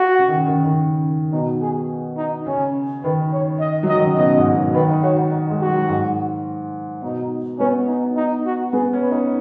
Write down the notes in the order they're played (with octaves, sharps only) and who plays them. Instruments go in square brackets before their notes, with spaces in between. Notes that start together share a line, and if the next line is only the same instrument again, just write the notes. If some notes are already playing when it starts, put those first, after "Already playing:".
Already playing: [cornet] F#4
[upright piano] C#3
D#3
C#3
D#3
C#3
D#3
C#3
[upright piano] B2 [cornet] D#4
[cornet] G#4
D#4
[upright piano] C#3 [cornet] C#4
[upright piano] D#3 [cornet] B4
[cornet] C#5
D#5
[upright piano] F#3
[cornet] D#5
[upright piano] D#3
C#3
[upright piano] B2 [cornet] D#5
[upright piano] G#2
B2
[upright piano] D#3 [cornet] B4
[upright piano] D#4
[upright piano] F#4 [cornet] C#5
[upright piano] D#4
D#4
G#3
[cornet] F#4
[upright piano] F#3
G#2
[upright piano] B2 [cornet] D#4
[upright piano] B3 [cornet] C#4
[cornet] D#4
D#4
F#4
[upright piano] B3 [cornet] G#4
[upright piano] C#4
[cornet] B4
[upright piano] D#4